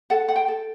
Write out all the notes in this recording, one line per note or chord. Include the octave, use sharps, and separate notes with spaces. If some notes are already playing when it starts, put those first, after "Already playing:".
A4 F#5
F#5
G5
A4